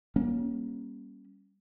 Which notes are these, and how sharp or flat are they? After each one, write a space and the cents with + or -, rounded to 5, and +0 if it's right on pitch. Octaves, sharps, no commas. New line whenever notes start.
G3 +0 A#3 +30 C#4 +0